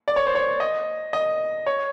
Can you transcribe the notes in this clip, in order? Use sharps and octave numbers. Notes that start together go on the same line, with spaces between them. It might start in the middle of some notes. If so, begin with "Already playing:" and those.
D5
C#5
C5
C#5
D#5
D#5
C#5